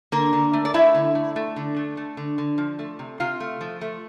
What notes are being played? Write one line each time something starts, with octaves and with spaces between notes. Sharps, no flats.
D3 A#3 A#4
D3
A3
D5
A3 E4 E5
D3
A3
A3
D3
A3
A3
D3
D3
F3
A3
C3
C3 F4 F5
A3
F3
A3